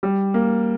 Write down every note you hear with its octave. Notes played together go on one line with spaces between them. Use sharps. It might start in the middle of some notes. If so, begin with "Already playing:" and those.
G3
A#3